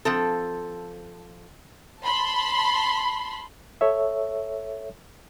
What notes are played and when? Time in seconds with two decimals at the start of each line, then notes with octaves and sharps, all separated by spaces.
0.05 F3 C4 A4
2.03 A5 B5 C6
3.81 A4 C#5 E5